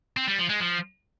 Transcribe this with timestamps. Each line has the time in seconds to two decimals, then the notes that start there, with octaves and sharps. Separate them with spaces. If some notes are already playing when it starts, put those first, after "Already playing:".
0.17 C4
0.28 G3
0.39 F3
0.49 G#3
0.60 F3